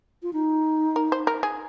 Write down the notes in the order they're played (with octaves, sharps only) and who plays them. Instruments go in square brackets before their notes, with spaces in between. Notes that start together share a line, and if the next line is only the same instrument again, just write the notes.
[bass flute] F4
D#4
[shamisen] A#4
C5
A#4
G#4